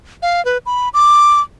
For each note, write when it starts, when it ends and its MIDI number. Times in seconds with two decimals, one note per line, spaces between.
0.22 0.44 77
0.45 0.58 71
0.66 0.89 83
0.94 1.41 86